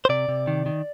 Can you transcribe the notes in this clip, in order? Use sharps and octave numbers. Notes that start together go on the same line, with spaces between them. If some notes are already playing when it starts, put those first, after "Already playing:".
C5
C3 D5
C3
D#3
D#3